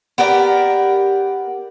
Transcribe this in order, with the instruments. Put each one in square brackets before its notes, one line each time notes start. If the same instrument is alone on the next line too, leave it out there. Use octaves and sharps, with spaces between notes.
[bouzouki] B3 G4 A#4 D5